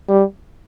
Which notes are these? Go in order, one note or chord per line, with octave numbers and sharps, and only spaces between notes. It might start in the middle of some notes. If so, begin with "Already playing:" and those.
G3